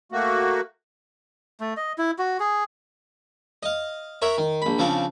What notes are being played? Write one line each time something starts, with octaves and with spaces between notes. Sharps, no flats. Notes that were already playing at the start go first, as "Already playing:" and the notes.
A3 A#3 F#4
A3
D#5
E4
F#4
G#4
D#5 F5
A#4 C#5 E5 F#5
D#3
A#1 B5
C#3 F3 C4 D4